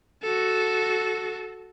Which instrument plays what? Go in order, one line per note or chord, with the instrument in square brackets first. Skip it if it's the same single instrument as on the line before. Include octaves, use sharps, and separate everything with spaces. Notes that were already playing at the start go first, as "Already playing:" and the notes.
[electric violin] F#4 A4